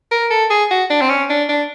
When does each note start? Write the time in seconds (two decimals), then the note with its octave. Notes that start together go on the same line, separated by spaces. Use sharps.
0.11 A#4
0.30 A4
0.50 G#4
0.70 F#4
0.90 D4
1.01 C4
1.09 C#4
1.30 D4
1.49 D4